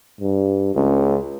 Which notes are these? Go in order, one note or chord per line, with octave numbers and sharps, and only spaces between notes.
G2
C#2 C#4